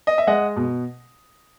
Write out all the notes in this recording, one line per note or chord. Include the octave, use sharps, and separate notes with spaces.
D#5
E5
G#3 D#5 F#5
B2